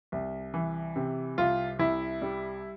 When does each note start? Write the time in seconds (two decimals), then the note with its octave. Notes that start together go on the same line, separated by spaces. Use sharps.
0.12 C2
0.54 E3
0.96 C3
1.38 C2 F4
1.79 C2 E4
2.22 G3